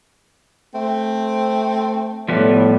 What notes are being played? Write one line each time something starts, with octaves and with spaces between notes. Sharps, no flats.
A3 C4
A2 F3 G3 B3 D5